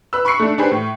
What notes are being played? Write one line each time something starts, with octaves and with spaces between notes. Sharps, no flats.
B4 E6
B5 C#6 F#6 C7 C#7
A3 D4
D4 G4 G#4 B4 C5
A2